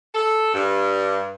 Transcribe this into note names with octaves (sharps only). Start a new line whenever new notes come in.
A4
G2